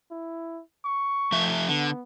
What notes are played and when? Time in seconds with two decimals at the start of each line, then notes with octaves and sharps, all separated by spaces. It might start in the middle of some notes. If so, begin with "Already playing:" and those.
0.11 E4
0.85 C#6
1.32 F3 A3 E5
1.69 D3 B3